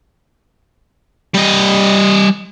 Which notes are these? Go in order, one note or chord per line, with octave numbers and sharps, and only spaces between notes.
G3 D#5